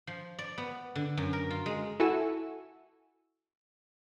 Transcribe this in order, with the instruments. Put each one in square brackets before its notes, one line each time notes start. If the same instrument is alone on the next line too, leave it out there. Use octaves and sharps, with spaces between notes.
[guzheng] F3
D5
B3
D3
F#2
A#4
F4
G#3
[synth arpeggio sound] E4 F#4 A4 G#5 C#6 E6